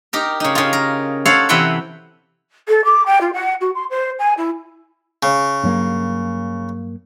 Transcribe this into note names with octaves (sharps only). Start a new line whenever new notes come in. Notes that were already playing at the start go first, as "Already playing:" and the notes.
D#4 G4 A#4
C#3 D#4
C#3 F4
A#4
A4 C5 C#5 F5 F#5
C3 E3 B4 F#5 G5 C6
A4
D6
G5
F4
F#5
F#4
C6
C5
G#5
E4
C#3
G2 F#3 A#3